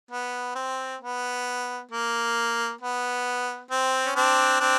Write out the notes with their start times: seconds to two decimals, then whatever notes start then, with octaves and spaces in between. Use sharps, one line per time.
0.11 B3
0.55 C4
1.01 B3
1.91 A#3
2.81 B3
3.71 C4
4.06 C#4
4.16 C4 D4
4.60 C4 D4